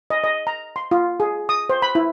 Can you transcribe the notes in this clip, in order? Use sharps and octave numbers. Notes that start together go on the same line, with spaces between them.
D#5
D#5
A#5
C6
F4
G#4
D#6
C5
B5
E4